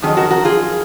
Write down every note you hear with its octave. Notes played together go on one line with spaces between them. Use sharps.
F2 D#3 F#3 G#4
F#4 A#4
F#4 A#4
F4 G#4